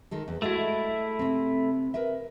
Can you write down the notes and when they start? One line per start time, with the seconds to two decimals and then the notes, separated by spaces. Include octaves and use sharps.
0.11 D#3 G#3 A4
0.28 E2
0.42 G#3 A3 E4 F#4
1.19 C3 C4
1.94 A#4 B4 E5